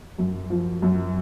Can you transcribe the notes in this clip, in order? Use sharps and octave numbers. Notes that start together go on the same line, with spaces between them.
F#2
F3
F#2